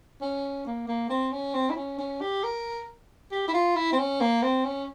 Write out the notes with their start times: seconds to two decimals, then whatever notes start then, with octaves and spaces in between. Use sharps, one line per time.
0.22 C#4
0.66 A#3
0.88 A#3
1.10 C4
1.32 C#4
1.54 C4
1.70 E4
1.76 C#4
1.99 C#4
2.21 G4
2.44 A#4
3.31 G4
3.48 E4
3.54 F4
3.76 E4
3.93 C4
3.98 C#4
4.21 A#3
4.43 C4
4.64 C#4